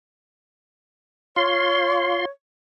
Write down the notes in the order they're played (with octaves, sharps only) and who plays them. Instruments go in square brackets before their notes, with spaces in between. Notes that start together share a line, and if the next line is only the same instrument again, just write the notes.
[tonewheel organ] F4 C6 [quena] C#5